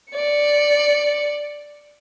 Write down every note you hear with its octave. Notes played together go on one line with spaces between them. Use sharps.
D5 C#7